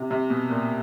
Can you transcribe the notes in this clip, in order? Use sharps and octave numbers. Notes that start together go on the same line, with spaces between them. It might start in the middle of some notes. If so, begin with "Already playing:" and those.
Already playing: C3
C3
B2
A#2